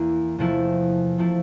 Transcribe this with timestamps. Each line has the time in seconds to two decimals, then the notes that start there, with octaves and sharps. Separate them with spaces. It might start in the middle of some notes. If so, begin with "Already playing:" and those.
Already playing: E2 E3 A#3 E4
0.38 E2 C3 F3 A3 E4
1.18 C3 F3 A3 E4